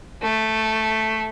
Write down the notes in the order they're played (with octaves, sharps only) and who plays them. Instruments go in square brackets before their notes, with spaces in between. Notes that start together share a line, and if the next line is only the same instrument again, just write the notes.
[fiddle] A3